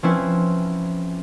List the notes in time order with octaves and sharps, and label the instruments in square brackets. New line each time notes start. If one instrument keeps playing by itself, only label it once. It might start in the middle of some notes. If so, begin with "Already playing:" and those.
[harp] F3 C4 C#4 E4 B4